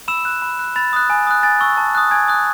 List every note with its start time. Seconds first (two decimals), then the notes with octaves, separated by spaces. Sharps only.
0.08 B5 E6 E7
0.25 F#6
0.42 B5
0.59 F#6
0.76 B5 A6
0.93 D#6 F#6
1.10 G#5
1.27 D#6 F#6
1.43 G#5 A6
1.61 C#6 E6
1.77 A5
1.95 D#6 F#6
2.11 G#5 G#6
2.28 D#6 F#6